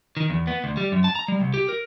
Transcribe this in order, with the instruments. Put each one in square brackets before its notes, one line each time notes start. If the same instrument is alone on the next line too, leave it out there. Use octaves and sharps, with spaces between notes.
[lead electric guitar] D#3
E2
B3
D2
G3
F#2
A5
A#5
G3
C2
G4
A#4